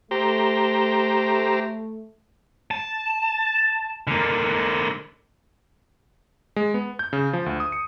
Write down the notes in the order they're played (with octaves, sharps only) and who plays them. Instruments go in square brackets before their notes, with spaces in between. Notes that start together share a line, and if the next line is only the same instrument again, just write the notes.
[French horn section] A3 [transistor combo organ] G4 C5 A#5
[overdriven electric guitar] A5
D3 A#3
[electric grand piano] G#3
B3
G6
C#3
F3
D2
D#6
C#7